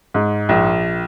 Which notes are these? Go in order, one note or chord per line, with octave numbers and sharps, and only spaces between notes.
G#2
A#1